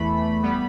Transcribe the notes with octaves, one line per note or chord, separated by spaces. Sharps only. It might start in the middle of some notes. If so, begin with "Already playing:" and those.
Already playing: E2 E3 A3 B5
G3 B3